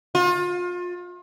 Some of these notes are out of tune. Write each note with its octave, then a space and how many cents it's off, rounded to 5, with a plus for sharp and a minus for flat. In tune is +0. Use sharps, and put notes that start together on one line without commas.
F4 +30